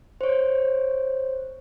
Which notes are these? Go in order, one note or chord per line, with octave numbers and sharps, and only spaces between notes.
C5 C#5